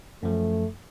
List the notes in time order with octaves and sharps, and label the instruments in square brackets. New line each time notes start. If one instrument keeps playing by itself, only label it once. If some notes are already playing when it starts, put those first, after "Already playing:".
[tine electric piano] F#2 F3 [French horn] A3